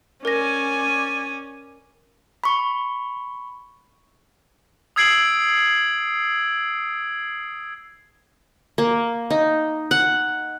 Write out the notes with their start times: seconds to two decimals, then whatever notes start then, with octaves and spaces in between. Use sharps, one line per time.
0.25 C#4 A#4 D5 G#5 A#6
2.44 B5 C#6
4.96 D#6 E6 G#6 C7 D7 F#7
8.78 A#3
9.30 D#4
9.91 F#5